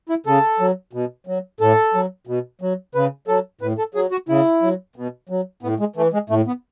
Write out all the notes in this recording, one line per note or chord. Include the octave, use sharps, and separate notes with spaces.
E4
C#3 A4
F#3
B2
F#3
A2 A4
F#3
B2
F#3
C#3 B4
F#3 A4
A2 B4
A4
F#3 G#4
F#4
C#3 E4
F#3
B2
F#3
A2 B3
G#3
E3 A3
G#3
A2 A3
B3